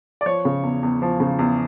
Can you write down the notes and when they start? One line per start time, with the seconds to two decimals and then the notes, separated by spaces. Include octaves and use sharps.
0.21 D5
0.26 F3 C#5
0.45 C#3
0.63 E2
0.83 E2
1.02 F3
1.20 C#3
1.39 E2